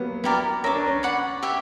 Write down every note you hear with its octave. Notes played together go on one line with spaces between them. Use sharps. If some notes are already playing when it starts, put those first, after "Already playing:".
Already playing: F#3 G3 A#3 B3
B3 E4 G4 A#4 D5
C#4 A#4 E5 A#5 D6
D4
C#4
D5 F#5 B5
G4 C#5 E5